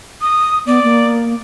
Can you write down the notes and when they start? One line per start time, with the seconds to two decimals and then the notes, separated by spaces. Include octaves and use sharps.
0.21 D#6
0.67 B3 D5
0.84 A#3